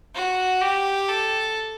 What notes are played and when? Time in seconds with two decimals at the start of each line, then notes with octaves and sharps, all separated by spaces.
0.15 F#4
0.61 G4
1.09 A4